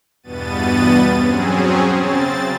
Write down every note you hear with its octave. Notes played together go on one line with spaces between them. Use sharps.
E2 G2 B2 B3 A6 D#7
F#3 C4 C#4 G#4
C#3 C4 A6